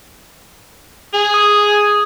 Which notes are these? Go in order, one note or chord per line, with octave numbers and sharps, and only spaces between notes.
G#4
D#6